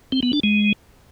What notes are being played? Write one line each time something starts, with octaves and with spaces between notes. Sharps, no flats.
C4
B3
D4
G#3